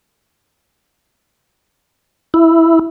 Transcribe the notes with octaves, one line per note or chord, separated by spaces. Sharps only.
E4